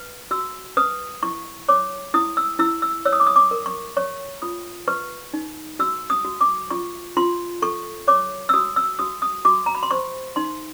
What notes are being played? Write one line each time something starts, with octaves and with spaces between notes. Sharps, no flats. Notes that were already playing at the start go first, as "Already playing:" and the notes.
Already playing: B4
F#4 E6
B4 D#6
E4 C#6
C#5 D6
E4 D#6
E6
E4 E6
E6
C#5 E6
D#6
D6
D#6
D6
A#4
C#6
C#5 C#6
F4 D#6
B4 C#6
D#4
F#4 E6
D#6
F#4
D6
F4 C#6
F4 C6
A4 C#6
C#5 D6
E6
F#4 D#6
E6
F#4 D#6
D#6
F#4 D6
A#5
B5
C6
C5 C#6
D#4 C6